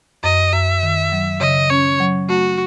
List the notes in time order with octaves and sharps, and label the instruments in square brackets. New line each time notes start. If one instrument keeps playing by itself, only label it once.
[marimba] F#2 [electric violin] D#5
[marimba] F#2 [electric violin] E5
[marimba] D#3
F#3
[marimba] C#3 [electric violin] D#5
[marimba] C#4 [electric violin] C#5
[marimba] F#3
[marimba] A3 [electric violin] F#4